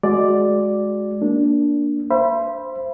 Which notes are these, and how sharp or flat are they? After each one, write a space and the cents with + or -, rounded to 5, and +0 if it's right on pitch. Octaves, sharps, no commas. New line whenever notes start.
G#3 +15 F#4 +0 D5 +0
A#3 +0 D4 -10
C5 +0 E5 +40 B5 -15